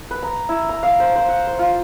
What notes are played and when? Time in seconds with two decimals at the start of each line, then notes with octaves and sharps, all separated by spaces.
0.11 B4
0.23 A#5
0.49 E4
0.69 A#5
0.83 F5
1.00 C5
1.15 C5
1.28 F#5
1.47 C5
1.59 F4